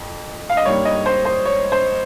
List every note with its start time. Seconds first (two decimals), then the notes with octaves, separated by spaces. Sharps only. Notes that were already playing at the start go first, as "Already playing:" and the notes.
Already playing: F2
0.50 F5
0.57 D#5
0.65 G2 G3 A#3 D#4 C#5
0.85 D#5
1.06 C5
1.25 C5
1.45 C#5
1.72 C5